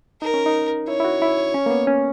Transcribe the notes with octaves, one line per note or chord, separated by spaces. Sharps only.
D#4 A#4
C#4
D#4
E4 C#5
E4
F#4
E4
C#4
A#3
B3
C#4